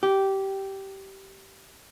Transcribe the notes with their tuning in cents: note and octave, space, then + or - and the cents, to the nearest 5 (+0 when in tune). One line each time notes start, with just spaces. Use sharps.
G4 -15